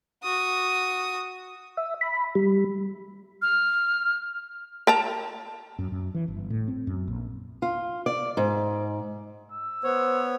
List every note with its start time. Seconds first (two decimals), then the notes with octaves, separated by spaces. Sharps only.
0.24 F#4 D#6
1.77 E5
2.01 B5
2.35 G3
3.42 F6
4.87 A#4 A5 A#5
5.78 F#2
5.92 F#2
6.14 E3
6.28 G1
6.50 A2
6.68 C4
6.87 F#2
7.08 A#1
7.62 F4
8.06 D5
8.37 G#2
9.52 E6
9.84 B3 C5 C#5